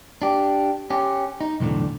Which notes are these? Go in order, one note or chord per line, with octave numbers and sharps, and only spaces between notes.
D4 G4
C#4 G4
D#4
B1 E2 A2 D3